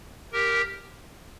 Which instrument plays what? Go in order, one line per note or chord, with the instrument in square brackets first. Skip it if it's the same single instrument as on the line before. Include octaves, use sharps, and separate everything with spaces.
[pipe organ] G4 A#4